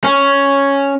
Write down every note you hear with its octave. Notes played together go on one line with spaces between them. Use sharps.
C#4